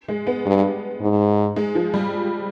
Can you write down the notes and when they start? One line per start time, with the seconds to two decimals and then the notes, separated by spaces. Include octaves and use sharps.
0.08 G#3
0.27 B3
0.46 G2
1.01 G#2
1.56 G#3
1.75 F3
1.94 G3